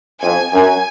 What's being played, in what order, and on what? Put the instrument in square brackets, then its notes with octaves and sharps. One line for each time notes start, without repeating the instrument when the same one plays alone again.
[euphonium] F2 [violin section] G#5
[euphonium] F#2 [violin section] G#5